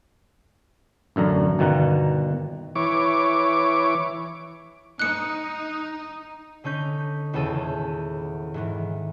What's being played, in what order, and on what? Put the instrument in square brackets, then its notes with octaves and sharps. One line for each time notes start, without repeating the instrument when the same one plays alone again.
[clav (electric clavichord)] A1 F#2 D3 A#5
G1 B2 D#3 F#5 A#5
[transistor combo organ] E3 C#5 D6
[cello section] D#4 [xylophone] F#6 C#7
[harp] D3 C#4 D#4 G6 B6
D#1 E2 C#3 G#4 A4 D#7
G#2 D#3 E3